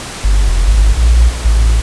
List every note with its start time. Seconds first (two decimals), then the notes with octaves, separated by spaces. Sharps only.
0.24 G1
0.49 F1
0.67 G#1
0.97 A#1
1.45 A1